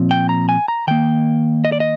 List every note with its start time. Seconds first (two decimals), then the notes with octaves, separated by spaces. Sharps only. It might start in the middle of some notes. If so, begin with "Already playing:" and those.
Already playing: A#2 F3 C4
0.11 G5
0.29 A#5
0.49 G#5
0.68 A#5
0.87 D#3 A#3 G5
1.65 D#5
1.72 D5
1.80 D#5